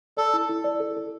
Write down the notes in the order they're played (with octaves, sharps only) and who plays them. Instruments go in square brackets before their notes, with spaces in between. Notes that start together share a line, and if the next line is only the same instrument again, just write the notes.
[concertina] A4 [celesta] D5
[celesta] E4
E4
D5
A4
A4